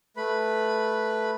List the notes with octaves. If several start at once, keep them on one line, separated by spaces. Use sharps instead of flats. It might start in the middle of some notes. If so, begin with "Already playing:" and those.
A3 B4 B5